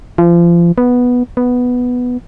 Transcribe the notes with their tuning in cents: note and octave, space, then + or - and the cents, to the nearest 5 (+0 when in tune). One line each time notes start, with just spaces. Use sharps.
F3 -30
B3 -5
B3 +0